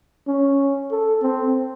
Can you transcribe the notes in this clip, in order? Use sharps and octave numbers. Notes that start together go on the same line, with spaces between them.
C#4
A4
C4